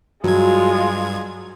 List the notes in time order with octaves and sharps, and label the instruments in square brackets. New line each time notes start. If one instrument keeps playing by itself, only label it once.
[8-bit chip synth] G2 G#6 [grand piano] F#3 [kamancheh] G#3 F4